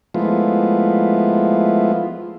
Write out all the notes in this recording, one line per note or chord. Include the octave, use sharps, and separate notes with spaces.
F3 G#3 A3 B3 E4 F4